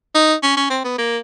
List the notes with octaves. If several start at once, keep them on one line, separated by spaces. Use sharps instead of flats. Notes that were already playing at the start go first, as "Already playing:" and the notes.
D#4
C#4
C#4
C4
B3
A#3